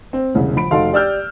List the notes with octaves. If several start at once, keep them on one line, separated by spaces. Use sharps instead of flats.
C4
E1 C2 C#3
F3 B5 D7
F1 D#4 F#4 A4 F5 C6
G4 D5 E6 F6 G6